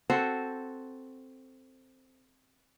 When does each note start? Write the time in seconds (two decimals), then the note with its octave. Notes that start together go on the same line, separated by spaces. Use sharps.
0.10 C4 F#4 A4 C5